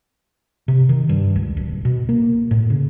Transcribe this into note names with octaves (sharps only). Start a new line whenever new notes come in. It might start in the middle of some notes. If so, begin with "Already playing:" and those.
C3
D#3
G2
C#2
D1
B2
A#3
A2
C#3